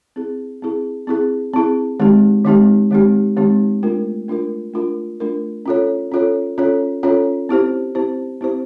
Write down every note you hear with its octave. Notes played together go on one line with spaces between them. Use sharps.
C4 E4 G#4
C4 E4 G#4
C4 E4 G#4
C4 E4 G#4
D#3 G#3 C4 D#4 G4
D#3 G#3 C4 D#4 G4
D#3 G#3 C4 D#4 G4
D#3 G#3 C4 D#4 G4
A3 D4 F4 A#4
A3 D4 F4 A#4
A3 D4 F4 A#4
A3 D4 F4 A#4
C#4 F4 A4 C#5
C#4 F4 A4 C#5
C#4 F4 A4 C#5
C#4 F4 A4 C#5
C4 E4 G4 C5
C4 E4 G4 C5
C4 E4 G4 C5